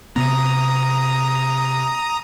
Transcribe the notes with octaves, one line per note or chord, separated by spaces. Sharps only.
C3 B3 A#5 D#6